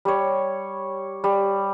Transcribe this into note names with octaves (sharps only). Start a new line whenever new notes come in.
G3 C#5
G3